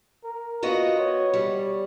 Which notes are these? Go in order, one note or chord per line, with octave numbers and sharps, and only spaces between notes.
A#4
B3 F4 F#4 D#5
C#5
G3